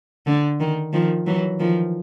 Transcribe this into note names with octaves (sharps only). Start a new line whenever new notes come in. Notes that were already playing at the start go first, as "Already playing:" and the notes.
D3
D#3
D#3 F3
E3 F#3
D#3 F3